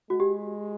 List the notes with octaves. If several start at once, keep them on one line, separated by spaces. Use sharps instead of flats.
G#3 F#4
G4